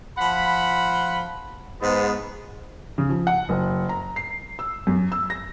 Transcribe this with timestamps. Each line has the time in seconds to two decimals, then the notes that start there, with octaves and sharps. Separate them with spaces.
0.18 F3 F#5 B5
1.81 G#2 B3
2.98 C#3
3.10 F3
3.27 F#5
3.49 F#1
3.89 A#5
4.16 C7
4.59 E6
4.87 F#2
5.12 E6
5.30 A#6